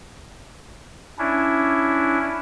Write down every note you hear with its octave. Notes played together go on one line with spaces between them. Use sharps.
C#4 D4 E4